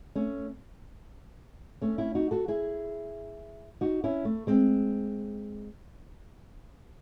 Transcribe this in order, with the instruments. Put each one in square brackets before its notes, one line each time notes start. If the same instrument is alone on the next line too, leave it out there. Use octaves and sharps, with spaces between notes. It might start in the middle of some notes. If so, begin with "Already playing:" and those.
[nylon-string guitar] A3 C#4
A3 C#4
C#4 E4
D#4 F#4
F#4 A4
E4 G#4
D#4 F#4
C#4 E4
A3
G#3 C4